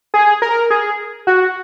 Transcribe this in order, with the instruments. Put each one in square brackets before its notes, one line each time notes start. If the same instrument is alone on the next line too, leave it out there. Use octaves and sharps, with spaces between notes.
[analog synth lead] G#4
A#4
G#4
F#4